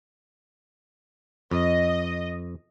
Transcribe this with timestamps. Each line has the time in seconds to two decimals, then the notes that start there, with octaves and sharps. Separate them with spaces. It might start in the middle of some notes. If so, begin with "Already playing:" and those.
1.51 F2 D#5